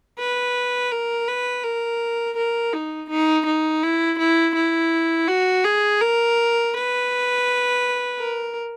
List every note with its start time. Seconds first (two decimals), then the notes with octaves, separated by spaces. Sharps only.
0.19 B4
0.91 A#4
1.28 B4
1.64 A#4
2.37 A#4
2.73 D#4
3.10 D#4
3.46 D#4
3.83 E4
4.19 E4
4.55 E4
5.28 F#4
5.64 G#4
6.01 A#4
6.73 B4
8.19 A#4